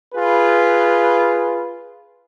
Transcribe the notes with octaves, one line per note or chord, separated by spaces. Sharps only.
F4 G#4 B4